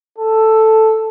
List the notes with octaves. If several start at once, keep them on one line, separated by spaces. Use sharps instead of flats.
A4